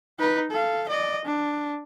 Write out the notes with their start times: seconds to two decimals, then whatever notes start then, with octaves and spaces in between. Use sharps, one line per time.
0.19 D#4 B4
0.51 A4 F5
0.89 D5 D#5
1.25 D4